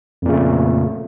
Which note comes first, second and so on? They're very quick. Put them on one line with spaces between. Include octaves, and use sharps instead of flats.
F2 A#2 C#3 A3